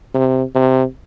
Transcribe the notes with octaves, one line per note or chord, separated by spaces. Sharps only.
C3
C3